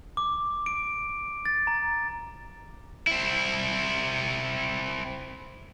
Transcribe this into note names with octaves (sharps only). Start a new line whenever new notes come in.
D6
D7
A6
A#5
C4 E4